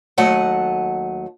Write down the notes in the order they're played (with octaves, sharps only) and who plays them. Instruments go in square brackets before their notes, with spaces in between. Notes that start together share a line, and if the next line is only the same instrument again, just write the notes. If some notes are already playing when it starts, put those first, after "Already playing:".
[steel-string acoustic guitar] D#2 F#3 A3 D#5 F#5